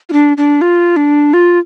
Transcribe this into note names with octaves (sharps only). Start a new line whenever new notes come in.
F4
D4
D4
F4
D4
F4